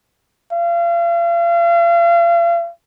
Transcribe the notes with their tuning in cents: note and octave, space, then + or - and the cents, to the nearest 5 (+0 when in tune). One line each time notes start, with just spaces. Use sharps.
F5 -40